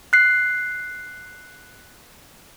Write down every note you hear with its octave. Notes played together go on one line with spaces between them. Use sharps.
F#6 C7